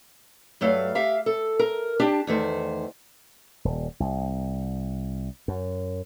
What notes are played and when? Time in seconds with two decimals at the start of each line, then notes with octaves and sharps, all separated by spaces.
0.61 G2 F#3 A3 F5
0.95 G4 E5 F5
1.26 A4
1.59 A#4
2.00 D4 G4 A5
2.27 E2 D#3 A3 C5
3.65 D#1
4.00 C2
5.48 F#2